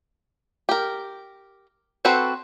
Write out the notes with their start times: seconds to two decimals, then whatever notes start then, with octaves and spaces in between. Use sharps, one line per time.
0.69 G4 A#4
2.05 C4 F#4 A4 B4 C5